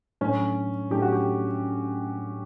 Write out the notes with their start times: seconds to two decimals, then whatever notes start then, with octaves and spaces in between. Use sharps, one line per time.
0.21 A2 F#3 A3 C#4 D4
0.90 A2 F#3 A3 D4 G4
1.02 F#4
1.12 G4